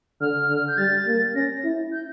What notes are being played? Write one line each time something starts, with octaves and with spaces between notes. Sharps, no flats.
D3 F6
D3
G6
G3 A6
A#3
C#4 A#6
E4
G6